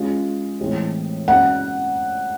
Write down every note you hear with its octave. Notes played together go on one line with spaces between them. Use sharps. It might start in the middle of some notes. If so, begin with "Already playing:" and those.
Already playing: G#3 C#4 F4
A2 E3 G#3 C4
G#3 C#4 F#4 F#5